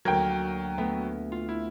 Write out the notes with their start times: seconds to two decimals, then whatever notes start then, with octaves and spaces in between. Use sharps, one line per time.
0.05 D2 F#3 A#3 A#4 G5 G#6
0.78 A3 B3
1.32 F4
1.49 E4